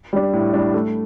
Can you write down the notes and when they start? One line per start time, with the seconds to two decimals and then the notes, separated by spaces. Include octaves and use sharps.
0.13 G3 D4
0.33 A2
0.53 G3 D4
0.74 A3